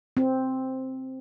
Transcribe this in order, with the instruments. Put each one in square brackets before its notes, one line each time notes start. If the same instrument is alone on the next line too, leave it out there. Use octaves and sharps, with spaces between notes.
[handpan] C4